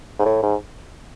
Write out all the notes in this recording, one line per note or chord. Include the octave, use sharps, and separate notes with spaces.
G#2
A2
G#2